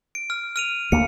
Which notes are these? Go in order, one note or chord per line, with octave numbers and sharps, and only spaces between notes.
D7
F6
F6 D#7 F7
D2 A#3 C#7